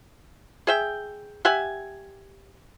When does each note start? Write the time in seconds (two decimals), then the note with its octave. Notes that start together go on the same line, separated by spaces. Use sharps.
0.67 G#4 E5 G5
1.45 G4 E5 F#5 G#5